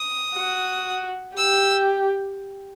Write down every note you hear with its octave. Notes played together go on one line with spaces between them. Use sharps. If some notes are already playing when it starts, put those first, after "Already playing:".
Already playing: D#6
F#4
G4 E6